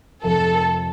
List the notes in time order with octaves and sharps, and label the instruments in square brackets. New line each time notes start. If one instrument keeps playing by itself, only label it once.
[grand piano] F1 F2 C3 F3 [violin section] A4